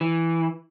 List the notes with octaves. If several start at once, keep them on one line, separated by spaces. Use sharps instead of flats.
E3